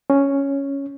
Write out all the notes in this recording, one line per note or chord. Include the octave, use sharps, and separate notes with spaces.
C#4